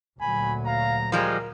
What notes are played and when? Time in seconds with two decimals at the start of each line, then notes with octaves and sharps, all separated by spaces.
0.21 D2 A#2 F#3 G#5 B5
0.66 F5 A#5
1.12 F3 G3 G#3 A#4 A#5